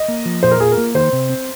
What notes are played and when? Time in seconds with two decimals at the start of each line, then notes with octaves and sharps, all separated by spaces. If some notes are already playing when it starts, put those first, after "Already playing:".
Already playing: D#5
0.08 A#3
0.25 F3
0.43 A#2 C5
0.51 A#4
0.60 F4 G#4
0.72 A#4
0.78 A#3
0.95 D#3 C5
1.13 C3
1.29 C4